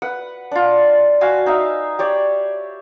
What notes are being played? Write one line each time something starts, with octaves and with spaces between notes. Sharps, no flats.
B4 F#5
D4 F4
F#4 F5 G#5 B5
D#4 E5 F5
G4 C#5 D5